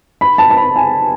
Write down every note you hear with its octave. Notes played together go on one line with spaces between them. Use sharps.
B5
A5
A5
B5
G#5